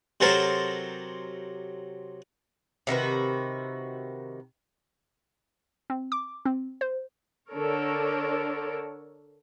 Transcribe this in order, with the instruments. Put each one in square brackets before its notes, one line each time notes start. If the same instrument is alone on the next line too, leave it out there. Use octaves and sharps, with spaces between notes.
[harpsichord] C3 F#3 A4 A#4 C5 A5
[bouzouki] C3 D#3 F#4 B4
[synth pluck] C4
D6
C4
C5
[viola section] D3 D4 A4 A#4 C#5